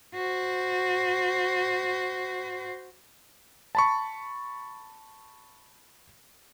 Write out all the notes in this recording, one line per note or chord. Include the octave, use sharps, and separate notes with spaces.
F#4 C5
A5 B5 C#6